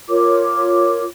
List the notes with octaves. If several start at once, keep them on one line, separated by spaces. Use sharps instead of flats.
F4 A#4 C#5 D6